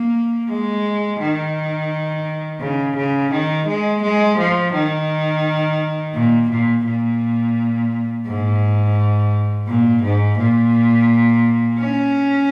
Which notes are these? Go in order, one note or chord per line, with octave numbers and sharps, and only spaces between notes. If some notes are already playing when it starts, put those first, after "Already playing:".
Already playing: A#3
G#3
D#3
C#3
C#3
D#3
G#3
G#3
F3
D#3
A#2
A#2
A#2
G#2
A#2
G#2
A#2
C#4